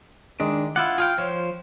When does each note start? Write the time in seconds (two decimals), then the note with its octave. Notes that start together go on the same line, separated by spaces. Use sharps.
0.40 D#3 G#3 D4
0.76 E4 F4 F#5 D6
0.98 F4 G#4 F5 G5
1.18 F3 C5 C#5